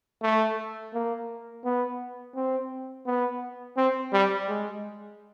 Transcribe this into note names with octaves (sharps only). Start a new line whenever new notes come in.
A3
A#3
B3
C4
B3
C4
G3
G#3